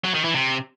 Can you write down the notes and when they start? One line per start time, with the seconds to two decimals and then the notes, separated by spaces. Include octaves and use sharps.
0.04 F#3
0.14 D#3
0.24 E3
0.34 C3